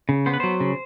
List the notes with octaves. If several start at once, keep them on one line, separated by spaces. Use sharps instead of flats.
C#3
B3 C5
B4
F#3 C5
C#3